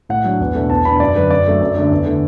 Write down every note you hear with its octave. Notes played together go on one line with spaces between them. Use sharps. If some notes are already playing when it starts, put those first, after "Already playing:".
A2 F#5
F#3 D4
E2
B2 A3 D4
E2 A5
B2 B3 D4 B5
F#2 D5
D3 F#3 B4
F#2 D5
F#3 A3 D4
F#2
D3 A3 D4
E2
D3 A3